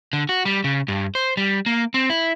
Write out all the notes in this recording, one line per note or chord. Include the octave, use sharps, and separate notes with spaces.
D3
F#4
G3
C#3
G2
C5
G3
A#3
C4
E4